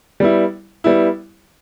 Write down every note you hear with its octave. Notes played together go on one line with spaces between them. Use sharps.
G3 B3 E4
G3 B3 E4